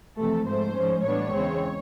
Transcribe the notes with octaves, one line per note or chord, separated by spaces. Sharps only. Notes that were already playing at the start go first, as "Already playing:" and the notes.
F2 C3 E3 A3 A4
G#2 F3 A3 C5
G#2 F3 G#3 C#4
A2 E3 G3 B3 D4 C#5
E2 C#3 E3 G#3 C4